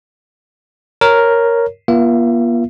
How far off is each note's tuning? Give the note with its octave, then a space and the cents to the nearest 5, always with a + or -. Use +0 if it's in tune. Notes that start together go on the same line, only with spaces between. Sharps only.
A#4 +0 C#5 +0
A#3 +45 F4 -20 E5 +40